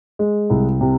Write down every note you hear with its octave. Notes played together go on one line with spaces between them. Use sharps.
G#3
C2
C3